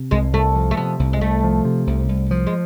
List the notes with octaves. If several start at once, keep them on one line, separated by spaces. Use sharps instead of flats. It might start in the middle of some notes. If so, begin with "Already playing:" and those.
Already playing: C3
C2 G#3
C2 A3
F3
A3
C3 B3
C2
G#3
C2 A3
F3
C3
C2
C2
F3
G#3